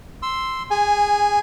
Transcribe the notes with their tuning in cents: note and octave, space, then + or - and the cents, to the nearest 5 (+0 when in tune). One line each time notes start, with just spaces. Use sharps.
C6 +0 E6 +0
G#4 -20 G#5 +0